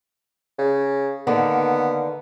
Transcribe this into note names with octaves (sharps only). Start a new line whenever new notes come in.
C#3
D3 D#3 A#3 B3